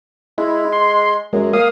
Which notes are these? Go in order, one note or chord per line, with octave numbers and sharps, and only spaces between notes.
G#3 E4
C6
F#2 G#3
A#3 F5 D#6